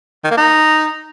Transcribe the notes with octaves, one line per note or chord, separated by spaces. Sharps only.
D#3
A#3
D#4